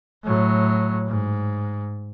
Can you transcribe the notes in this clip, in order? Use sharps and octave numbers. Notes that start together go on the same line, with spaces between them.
A2 F#3
G#2